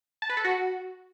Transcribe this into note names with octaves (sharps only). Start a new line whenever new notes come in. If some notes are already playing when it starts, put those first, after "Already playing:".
A5
B4
A4
F#4